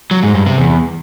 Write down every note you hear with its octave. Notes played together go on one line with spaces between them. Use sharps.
F#3
G#2
G2
C3
E2